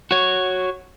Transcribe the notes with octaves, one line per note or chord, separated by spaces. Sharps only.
F#4 C#5